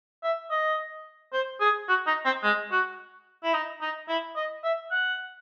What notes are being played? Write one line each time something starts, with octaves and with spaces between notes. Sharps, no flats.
E5
D#5
C5
G#4
F#4
D#4
C4
G#3
F#4
E4
D#4
D#4
E4
D#5
E5
F#5